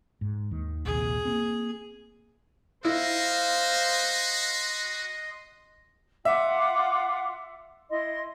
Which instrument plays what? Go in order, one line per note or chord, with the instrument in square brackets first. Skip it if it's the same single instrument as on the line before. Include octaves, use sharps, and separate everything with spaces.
[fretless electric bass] G#2
D#2 D#3
[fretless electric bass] A#1 D#2 C3 [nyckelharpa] G#4
[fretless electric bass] A#3 C4
[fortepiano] E4 [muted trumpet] F#4 [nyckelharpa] C5 F5 [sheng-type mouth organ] D#5 C6 D#6
[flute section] F4 F#5 D6 [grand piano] E5
[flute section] E4 D#5 C6